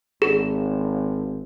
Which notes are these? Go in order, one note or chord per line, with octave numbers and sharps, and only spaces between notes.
G#1 G#4